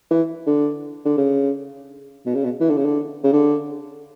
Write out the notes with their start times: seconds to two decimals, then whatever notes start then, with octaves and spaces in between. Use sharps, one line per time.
0.11 E3
0.46 D3
1.05 D3
1.17 C#3
2.26 B2
2.34 C#3
2.44 B2
2.60 E3
2.69 D3
2.77 C#3
2.85 D3
3.24 C#3
3.32 D3